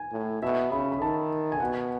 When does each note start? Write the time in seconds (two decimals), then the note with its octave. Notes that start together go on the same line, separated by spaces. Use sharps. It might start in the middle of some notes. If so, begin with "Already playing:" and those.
Already playing: G#5
0.12 A2
0.42 B2 E5
0.72 C#3 B5
0.92 B5
1.02 D#3 A5
1.52 G#5
1.60 B2 F#5